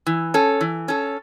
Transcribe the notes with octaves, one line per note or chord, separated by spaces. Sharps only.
E3
C#4 A4
E3
C#4 A4